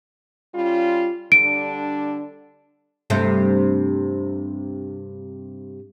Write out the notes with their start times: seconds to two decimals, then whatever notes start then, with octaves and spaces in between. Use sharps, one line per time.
0.54 G3 C#4 F4
1.32 D3 G3 D4 D7
3.10 G2 C3 A3